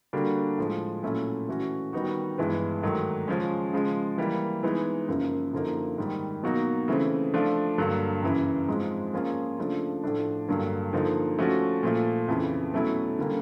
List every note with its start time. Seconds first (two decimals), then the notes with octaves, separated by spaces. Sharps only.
0.13 D3 G3 A#3 D4 F#4
0.58 A2 F3 G#3
1.03 A#2 F#3 A3 C#4 E4
1.49 E3 A3 C#4 F#4
1.93 D#3 G3 B3 D#4 F#4
2.38 G2 E3 G#3 B3
2.83 G#2 D#3 F#3 A3
3.28 C#3 F3 G#3 C#4
3.73 C#3 F3 G#3
4.18 E3 G3 A#3
4.63 E3 G#3 B3 D#4
5.08 F#2 C#3 F3 A#3
5.53 F#2 D3 F3 A#3 D#4
5.98 G#2 D#3 G3
6.43 B2 F#3 A#3 D#4 F#4
6.88 C#3 E3 A3 C4
7.34 F3 A3 D4 F4
7.78 G2 D3 F#3 A#3
8.23 F#2 C#3 E3
8.68 G#2 F3 G#3 C4
9.13 F3 A#3 C#4 F4 G#4
9.58 C#3 F3 A3 D4
10.04 A2 F3 A3 D4
10.48 G2 D3 F#3 A#3
10.93 D3 F3 A#3 D#4
11.38 F3 A3 C#4 F#4
11.83 A#2 F3 A3
12.28 F2 C#3 E3
12.73 B2 F#3 A3 C#4 E4
13.19 D3 G3 A#3 C#4